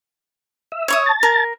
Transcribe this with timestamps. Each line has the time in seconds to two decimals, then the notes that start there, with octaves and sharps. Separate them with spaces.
0.72 E5
0.88 C#5 C#6 D#6
1.06 A5
1.23 A#4